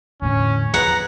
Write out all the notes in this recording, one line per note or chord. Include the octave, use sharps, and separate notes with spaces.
E2 A2 D3 C#4
F3 G#4 B4 F#5 A#5